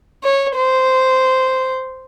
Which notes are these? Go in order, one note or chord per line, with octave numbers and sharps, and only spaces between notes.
C#5
C5